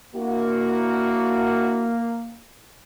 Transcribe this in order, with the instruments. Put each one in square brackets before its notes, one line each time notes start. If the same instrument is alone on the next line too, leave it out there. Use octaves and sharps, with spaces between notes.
[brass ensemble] A#3 [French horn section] D4 E4 F#4